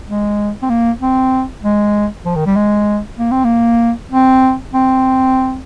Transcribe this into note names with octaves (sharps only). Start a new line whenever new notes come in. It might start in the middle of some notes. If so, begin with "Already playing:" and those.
G#3
C4
A#3
C4
G#3
F3
D#3
G3
G#3
A#3
C4
A#3
C4
C4